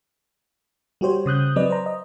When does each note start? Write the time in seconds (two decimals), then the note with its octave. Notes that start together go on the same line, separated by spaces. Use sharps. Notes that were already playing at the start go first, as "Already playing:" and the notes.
1.01 G3 F#4 G4 C5 C#5
1.26 C#3 D#6 F#6 G6
1.56 F#3 C4 B4 D5 D#5
1.70 C5 A#5
1.86 D#5